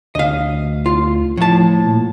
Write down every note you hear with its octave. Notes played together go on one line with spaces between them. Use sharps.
D2 D#5 F5
F4
A2 F3 A5
A#2